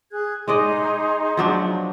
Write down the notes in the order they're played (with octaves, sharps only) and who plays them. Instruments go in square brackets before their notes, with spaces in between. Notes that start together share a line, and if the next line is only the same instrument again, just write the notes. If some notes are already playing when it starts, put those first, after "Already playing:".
[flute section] G#4 F#6 G#6
[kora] G#3 D5 D#5 [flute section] D#4 G#4 C6
[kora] F3 F#3 D4